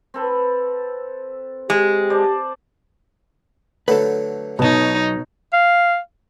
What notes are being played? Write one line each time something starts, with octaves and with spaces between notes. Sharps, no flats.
C4 A4 B4
G#3 G4
C5 D5 A5
D3 F#3 A3 A4 B4
B1 B2 D#4 C#5 A5
F5